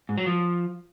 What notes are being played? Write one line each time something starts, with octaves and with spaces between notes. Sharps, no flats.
G#2
F#3
F3